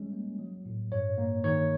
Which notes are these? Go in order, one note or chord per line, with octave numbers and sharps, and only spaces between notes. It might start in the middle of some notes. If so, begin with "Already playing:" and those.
Already playing: G3 G#3 C#4
A#3
F#3
A2
G2 C#5
A#3
D#3 C#5